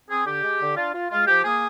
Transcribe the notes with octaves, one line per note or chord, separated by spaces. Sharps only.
C4 G#4
D3 G4
G#3
D3
D4 F4
F4
G#3 F4
F3 G4
A#3 G#4